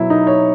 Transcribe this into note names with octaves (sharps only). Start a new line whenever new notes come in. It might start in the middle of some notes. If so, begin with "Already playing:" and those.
Already playing: B2 F#3 E4
D#4
C#5